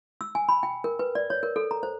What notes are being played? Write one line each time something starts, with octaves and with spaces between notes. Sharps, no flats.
E6
G#5
B5
G5
A#4
B4
D5
C#5
A#4
A4
A#5
C5